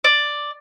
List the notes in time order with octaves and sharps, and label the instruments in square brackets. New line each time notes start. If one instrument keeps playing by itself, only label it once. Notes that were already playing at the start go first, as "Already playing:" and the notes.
[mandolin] D5